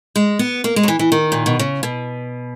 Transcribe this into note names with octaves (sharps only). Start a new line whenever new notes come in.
G#3
B3
A#3
G#3
F#3
E3
E3
D#3
A#2
B2
C#3
B2